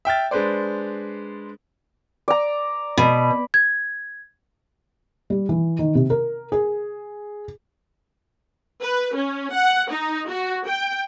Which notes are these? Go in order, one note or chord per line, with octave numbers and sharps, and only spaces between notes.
E5 G5 F6 A6
G#3 D4 B4 C5 D5
D5 A#5
B2 B5
G#6
G3
E3
D#3
C3
A#4
G#4
B4
C#4
F#5
D#4
F#4
G5